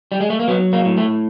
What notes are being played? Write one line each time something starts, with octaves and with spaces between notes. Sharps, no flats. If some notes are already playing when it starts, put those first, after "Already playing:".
G3
G#3
A3
A#3
F#3 B3
A#3
A2
A3